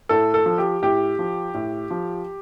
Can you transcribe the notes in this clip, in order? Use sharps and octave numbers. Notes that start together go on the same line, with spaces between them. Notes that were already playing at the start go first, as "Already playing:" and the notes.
A2 A4
A4
F3
G4
A2 G4
F3
A2
F3